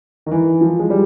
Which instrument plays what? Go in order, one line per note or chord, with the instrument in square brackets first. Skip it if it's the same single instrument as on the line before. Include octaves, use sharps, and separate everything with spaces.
[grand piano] D#3
E3
F3
G#3
G3